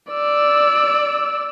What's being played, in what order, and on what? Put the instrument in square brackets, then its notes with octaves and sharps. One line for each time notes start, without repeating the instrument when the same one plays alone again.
[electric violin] D5 E6